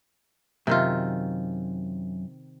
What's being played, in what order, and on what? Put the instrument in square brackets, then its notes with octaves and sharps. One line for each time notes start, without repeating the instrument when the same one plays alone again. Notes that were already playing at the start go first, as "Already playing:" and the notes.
[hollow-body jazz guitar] F#2 [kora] C3 D#3 F4